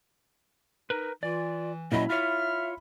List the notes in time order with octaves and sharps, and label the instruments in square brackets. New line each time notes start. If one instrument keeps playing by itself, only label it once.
[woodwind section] D#4 [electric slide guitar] A#4 B4
[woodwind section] E3 [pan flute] F4 [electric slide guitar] D5
[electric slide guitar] A#2 F#3 C#4 [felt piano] E4 B5 [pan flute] D#5
[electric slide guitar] F4 C#5 [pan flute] E5 [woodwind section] F6